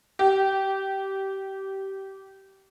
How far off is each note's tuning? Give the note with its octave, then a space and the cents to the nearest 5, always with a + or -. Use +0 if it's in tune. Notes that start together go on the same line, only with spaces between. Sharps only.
G4 -20